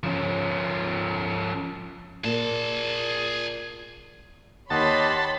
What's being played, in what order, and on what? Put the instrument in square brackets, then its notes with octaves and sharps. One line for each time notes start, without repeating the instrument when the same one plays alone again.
[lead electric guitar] F3 C#4
[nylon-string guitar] A#2 [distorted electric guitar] G#4 A5
[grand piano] D#2 [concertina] G4 D#5 F#5 [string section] C#5 B5 C6 [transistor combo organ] A5